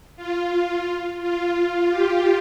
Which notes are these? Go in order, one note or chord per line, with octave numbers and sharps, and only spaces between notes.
F4
F4
G4